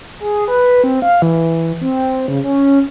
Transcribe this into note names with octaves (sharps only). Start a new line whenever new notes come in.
G#4
B4
C4
F5
E3
C4
C#3
C#4